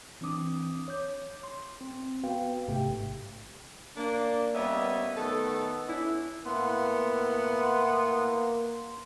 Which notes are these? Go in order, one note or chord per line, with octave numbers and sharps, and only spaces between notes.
E3 C4 D4 D6 D#6
C#5 D6 G6
C6
C4
B3 F#4 B4 F5 G5
A1 G#2 C3 A3 G4 G5
A#3 D4
G3 A#3 B3 C#4 D#5 E5
D#3 A3 B3 A4
B3 C#4 D4 E4
A2 A#3 B3 E4 F#5 C6